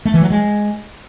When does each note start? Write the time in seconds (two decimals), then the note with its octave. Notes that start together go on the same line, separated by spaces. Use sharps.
0.05 A3
0.14 E3
0.22 F#3
0.30 G#3